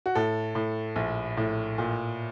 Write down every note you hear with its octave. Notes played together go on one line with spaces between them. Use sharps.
F#4
A2 A4
A2
A#1
A2
A#2